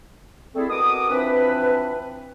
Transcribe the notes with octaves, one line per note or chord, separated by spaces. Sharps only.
G3 A3 C4 E4 G#4 A4
B2 F#4 A#4 D6 D#6
E3 F3 C4 D4 B4